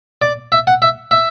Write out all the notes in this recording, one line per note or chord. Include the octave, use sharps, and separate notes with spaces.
D5
E5
F#5
E5
E5